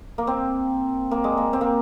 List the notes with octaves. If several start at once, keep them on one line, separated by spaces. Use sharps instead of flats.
A#3
C4
A#3
G#3
A#3
C4
A#3